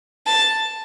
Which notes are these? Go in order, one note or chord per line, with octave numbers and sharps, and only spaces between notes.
A5